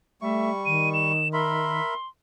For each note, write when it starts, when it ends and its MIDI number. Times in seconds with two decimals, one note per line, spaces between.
0.22 1.12 55
0.22 0.51 57
0.22 0.51 76
0.22 1.12 85
0.66 1.80 51
0.66 0.89 99
0.94 1.28 100
1.33 1.94 70
1.33 1.94 76
1.33 1.94 83
1.33 2.07 84